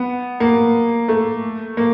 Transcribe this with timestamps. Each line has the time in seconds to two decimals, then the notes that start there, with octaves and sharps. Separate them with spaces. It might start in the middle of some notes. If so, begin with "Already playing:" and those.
Already playing: B3
0.40 A#3
1.08 A3
1.77 A#3